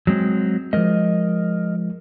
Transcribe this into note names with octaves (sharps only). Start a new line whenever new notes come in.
F#3 G#3 C4
F3 G#3 A#4 D#5